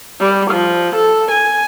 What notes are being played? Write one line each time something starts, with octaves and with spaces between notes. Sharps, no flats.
G3
F3
A4
G#5